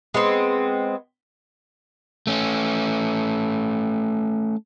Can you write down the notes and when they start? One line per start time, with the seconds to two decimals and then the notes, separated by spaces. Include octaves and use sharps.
0.14 G#3 B3 C4
2.27 A3 C#4